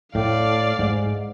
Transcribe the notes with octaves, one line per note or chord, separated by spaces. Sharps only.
A2 D5 F5
G#2